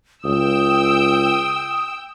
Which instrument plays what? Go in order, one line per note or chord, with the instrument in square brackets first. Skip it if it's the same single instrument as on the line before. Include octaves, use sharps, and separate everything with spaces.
[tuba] C#2 [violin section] G5 E6 [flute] D#6